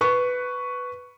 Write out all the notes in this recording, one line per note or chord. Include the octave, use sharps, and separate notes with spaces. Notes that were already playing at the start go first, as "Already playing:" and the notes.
B4 C#6